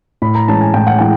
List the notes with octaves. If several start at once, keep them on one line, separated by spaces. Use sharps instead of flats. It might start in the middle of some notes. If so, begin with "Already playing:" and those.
A2 B5
A#5
E3 G#3 C#4 A5
G#5
A2 G5
F#5
E3 G#3 G5